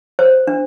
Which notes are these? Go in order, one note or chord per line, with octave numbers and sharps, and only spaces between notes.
C5
D4